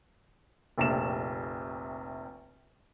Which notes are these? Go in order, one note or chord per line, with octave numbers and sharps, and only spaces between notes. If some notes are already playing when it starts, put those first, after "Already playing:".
F1 A#1 C3 E7